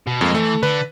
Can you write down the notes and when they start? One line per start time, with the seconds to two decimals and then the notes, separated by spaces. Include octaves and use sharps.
0.07 B2
0.21 F2 G#3 A#3
0.35 E3 A3
0.63 D3 B4